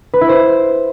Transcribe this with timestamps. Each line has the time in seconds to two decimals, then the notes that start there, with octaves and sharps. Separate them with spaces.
0.14 B4
0.21 E4
0.29 C5